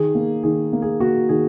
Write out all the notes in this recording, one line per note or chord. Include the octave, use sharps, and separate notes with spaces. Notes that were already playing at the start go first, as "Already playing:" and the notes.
Already playing: D#3 G#4
A#3
D#3 G#4
A#3
G#4
A#3 F#4
D#3 G#4